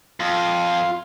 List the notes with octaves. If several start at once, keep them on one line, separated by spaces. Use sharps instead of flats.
F2 F4